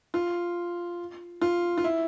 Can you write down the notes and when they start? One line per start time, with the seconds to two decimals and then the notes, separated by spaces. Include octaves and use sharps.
0.14 F4
1.41 F4
1.78 F4
1.84 E4